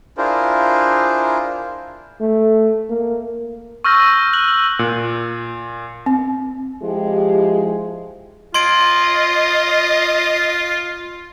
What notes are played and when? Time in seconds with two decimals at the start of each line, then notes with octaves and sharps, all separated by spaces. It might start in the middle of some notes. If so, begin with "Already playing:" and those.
0.18 D4 E4 F4 G#4 A#4 C5
2.21 A3
2.90 A#3
3.84 C#6 E6 F6 G6 A#6
4.33 F#6 F#7
4.79 A#2
6.06 C4
6.83 F3 G#3 E4 G4
8.54 F4 D#5 C6 G#6 D7